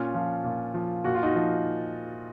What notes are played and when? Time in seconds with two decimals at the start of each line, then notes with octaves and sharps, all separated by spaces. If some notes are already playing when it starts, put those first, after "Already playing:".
Already playing: A#2 C#4 F4
0.14 F3
0.44 A#2
0.74 F3
1.04 A#2 F#4
1.15 F4
1.23 D#4 F#4
1.35 F3